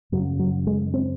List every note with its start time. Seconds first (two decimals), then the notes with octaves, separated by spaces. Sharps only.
0.12 F#2 C#3 F#3
0.39 F#3
0.67 G#3
0.94 C4